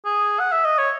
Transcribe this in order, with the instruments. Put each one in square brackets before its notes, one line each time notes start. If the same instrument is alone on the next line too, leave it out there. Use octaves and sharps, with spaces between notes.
[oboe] G#4
F#5
E5
D#5
C#5